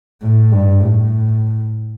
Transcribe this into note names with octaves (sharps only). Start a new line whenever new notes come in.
A2
G2
A2